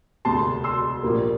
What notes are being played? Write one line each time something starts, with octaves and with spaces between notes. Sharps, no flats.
E1 D2 C3 A5 C6
C6 E6
A#1 A#2 G3 A#3